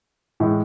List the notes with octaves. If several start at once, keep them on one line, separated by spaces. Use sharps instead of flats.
A2 E3 G#3